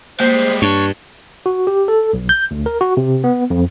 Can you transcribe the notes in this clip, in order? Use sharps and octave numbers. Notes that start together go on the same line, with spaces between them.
G3 G#3 A#3 C5
G2 D4 C#5
F#4
G4
A4
B1
G6
D2
A#4
F#4
C3
B3
F2